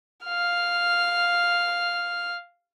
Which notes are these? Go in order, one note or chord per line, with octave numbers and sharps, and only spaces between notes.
F5 F6